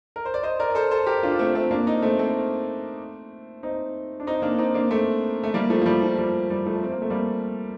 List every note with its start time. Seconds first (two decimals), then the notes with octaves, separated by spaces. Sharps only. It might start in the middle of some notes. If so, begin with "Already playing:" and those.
0.16 A#4
0.25 C5
0.34 D5
0.43 C5 D#5
0.59 A#4 D5
0.70 D5
0.75 A4 C5
0.91 A4 C5
1.07 G4 A#4
1.23 D4 F4
1.39 A3 C4
1.55 A3 C4
1.71 A#3 D4
1.86 C4 D#4
2.02 A3 C4
2.19 A3 C4
3.63 C4 D#4
4.20 D4
4.27 C4 D#4
4.42 A#3 D4
4.58 C4 D#4
4.74 A#3 D4
4.91 A3 C4
5.43 A3
5.54 G3 A#3
5.70 F3 A3
5.82 F3
5.86 G3
6.03 F3
6.18 G3
6.50 G3
6.66 F3 A3
6.83 C4
6.92 A#3
7.02 A3
7.10 G3 A#3